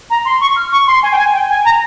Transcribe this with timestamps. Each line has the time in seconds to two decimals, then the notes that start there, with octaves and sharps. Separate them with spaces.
0.10 A#5
0.25 C6
0.41 C#6
0.56 F6
0.72 C#6
0.87 C6
1.03 G#5
1.12 G5
1.18 G#5
1.34 G5
1.49 G#5
1.65 A#5